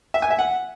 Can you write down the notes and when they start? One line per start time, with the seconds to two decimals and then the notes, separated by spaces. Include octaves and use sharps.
0.14 E5
0.22 G#5
0.30 E5
0.39 F#5